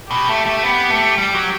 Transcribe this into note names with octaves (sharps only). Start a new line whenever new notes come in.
B2 G4
A3
A3
B3
A3
G3
F#3